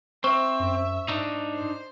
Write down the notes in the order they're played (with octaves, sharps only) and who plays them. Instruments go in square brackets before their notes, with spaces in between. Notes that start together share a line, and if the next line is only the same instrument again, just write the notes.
[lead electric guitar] C4 [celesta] C5 C#6 [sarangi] E5
[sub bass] F#2
[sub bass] G#2 [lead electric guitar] D4 D#4
[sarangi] C5